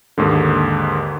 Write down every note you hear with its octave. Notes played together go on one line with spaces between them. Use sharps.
D#2 G#2 D3